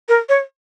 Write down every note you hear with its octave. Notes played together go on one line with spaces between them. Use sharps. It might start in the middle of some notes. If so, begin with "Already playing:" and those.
A#4
C#5